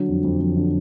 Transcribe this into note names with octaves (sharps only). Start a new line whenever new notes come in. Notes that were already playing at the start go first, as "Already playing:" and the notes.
Already playing: D3 F#3
F2
F2
F2
D3